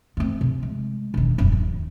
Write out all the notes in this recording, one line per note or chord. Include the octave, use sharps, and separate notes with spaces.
A3 C4
C3
G#3
E1 D#3
D#1 F#2
D#2